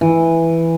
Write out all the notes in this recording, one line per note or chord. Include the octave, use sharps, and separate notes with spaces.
E3